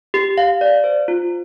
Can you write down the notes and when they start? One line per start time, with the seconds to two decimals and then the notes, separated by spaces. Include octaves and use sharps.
0.14 G4
0.38 F5
0.61 D5
0.84 C5
1.08 F4